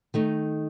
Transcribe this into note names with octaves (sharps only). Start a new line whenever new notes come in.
D#3 A3 D#4